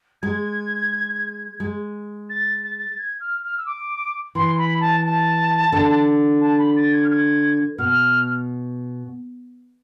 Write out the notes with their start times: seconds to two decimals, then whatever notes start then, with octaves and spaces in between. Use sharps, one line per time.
0.22 G#3 G#6
1.60 G#3
2.29 A6
2.64 A6
2.79 A6
2.89 A6
2.98 G#6
3.20 F6
3.43 F6
3.57 E6
3.66 D6
4.35 E3 C6
4.58 B5
4.80 A5
5.03 A5
5.72 D3
6.41 A5
6.58 B5
6.76 A6
6.92 G#6
7.04 F6
7.10 G#6
7.78 B2 F6